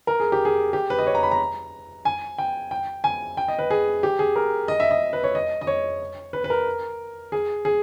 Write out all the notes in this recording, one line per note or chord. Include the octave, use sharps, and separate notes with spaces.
A#4
G#4
G4
G#4
G4
B4
D#5
C#5
A#5
B5
A#5
G#5
G5
G5
G#5
G5
D#5
B4
G#4
G4
G#4
A#4
D#5
E5
D#5
B4
C#5
D#5
D#5
C#5
B4
B4
A#4
G#4
G#4